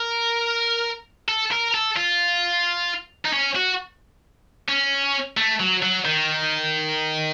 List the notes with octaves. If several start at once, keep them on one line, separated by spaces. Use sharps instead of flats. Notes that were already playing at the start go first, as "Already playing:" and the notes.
Already playing: A#4
A4
A#4
A4
F4
D#4
C#4
F#4
C#4
A3
F#3
F#3
D#3